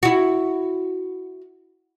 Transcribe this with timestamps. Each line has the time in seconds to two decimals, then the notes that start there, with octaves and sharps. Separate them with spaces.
0.03 E4 F#4